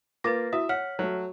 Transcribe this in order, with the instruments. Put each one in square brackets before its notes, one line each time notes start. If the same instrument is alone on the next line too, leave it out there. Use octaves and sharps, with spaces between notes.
[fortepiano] A#3 F4 D6 [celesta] B4 A6 A#6
[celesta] E4 F#4 D#6 [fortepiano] E5
[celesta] C#5 F6 B6 [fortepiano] F#5
[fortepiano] F#3 A3